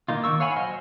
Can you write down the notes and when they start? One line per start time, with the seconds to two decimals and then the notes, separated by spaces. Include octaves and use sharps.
0.08 A#3 D#4 F4
0.24 D#3 A#3 C#6 E6
0.40 C#5 F5 F#5 G#5 B5
0.56 F#3 C5 D#5 G#5 F6